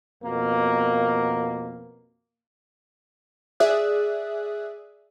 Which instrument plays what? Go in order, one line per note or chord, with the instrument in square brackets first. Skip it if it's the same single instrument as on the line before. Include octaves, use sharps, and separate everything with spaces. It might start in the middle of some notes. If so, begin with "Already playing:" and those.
[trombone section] F2 B2 A#3
[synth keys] G#4 D5 E5 D#6 F#6